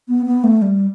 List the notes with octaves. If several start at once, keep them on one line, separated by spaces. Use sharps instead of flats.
B3
B3
A3
G3